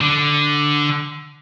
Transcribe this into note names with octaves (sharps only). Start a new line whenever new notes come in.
D3